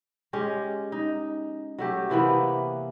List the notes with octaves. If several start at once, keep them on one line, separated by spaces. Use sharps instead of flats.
G#3 C#4 G4
D#4
F#3 A3 G4
C3 E3 A#3 B3